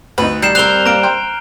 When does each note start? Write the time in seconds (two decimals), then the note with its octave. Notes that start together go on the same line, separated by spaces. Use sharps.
0.18 D2 D#4 B4
0.42 D#3 G3 G6 C7 E7
0.55 C4 A#4 F#6 F7 G7
0.85 A#3 F5 A#5 D7
1.03 G5 C6 F6